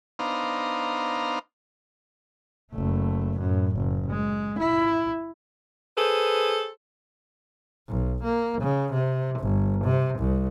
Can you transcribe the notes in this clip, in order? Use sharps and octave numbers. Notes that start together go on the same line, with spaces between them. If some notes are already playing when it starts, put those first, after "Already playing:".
B3 D4 D#4 C5 F5 A#5
F#1 A3
F#2 A2
F#1
G#3
E4
G#4 A4 B4 C5
B1
A#3
C#3
C3
G1
C3
C2